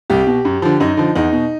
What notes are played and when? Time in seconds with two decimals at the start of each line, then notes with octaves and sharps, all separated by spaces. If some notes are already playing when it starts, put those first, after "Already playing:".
0.10 C2 G4
0.27 B2
0.45 F#2
0.62 D3 F3
0.80 F#2 D#4
0.97 D3 F3
1.15 E2 D#4
1.33 B2